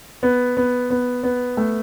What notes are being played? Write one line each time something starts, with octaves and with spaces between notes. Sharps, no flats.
B3
B3
B3
B3
A3